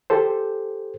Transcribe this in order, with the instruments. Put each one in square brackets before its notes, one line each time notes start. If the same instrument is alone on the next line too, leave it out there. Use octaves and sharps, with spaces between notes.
[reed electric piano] G4 A4 C5